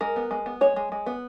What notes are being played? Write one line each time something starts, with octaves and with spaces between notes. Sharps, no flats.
G#3 A#4
B3
G#3
B3
G#3 C#5
G#3
G#3
B3